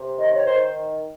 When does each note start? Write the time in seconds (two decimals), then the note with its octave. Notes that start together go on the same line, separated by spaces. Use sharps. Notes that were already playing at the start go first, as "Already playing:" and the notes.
Already playing: C3
0.19 D#3 D#5
0.32 C#5
0.45 D#3 C5